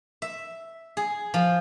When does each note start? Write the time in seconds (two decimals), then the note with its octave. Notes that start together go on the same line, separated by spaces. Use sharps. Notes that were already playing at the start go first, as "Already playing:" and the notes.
0.22 E5
0.97 G#4
1.34 F3